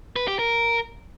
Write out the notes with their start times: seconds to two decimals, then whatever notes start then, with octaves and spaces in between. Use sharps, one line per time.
0.16 B4
0.28 G4
0.39 A#4